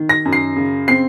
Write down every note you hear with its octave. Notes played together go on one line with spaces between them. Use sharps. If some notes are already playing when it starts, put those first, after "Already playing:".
Already playing: D#3
A#6
F#2
C7
C#3
C4 C7